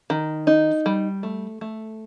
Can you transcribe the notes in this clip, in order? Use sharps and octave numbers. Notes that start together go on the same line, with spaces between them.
D#3
D#4
G3
A3
A3